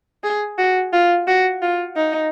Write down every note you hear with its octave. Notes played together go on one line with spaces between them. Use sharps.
G#4
F#4
F4
F#4
F4
D#4